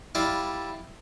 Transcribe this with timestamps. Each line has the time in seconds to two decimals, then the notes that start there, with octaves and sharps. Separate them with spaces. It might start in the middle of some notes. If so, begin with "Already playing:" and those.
0.15 G3 E4 F4 D5